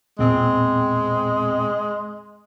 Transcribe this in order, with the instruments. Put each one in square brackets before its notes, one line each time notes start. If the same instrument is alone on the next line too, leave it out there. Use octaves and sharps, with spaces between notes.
[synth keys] E2 C4 [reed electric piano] A#2 [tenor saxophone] G#3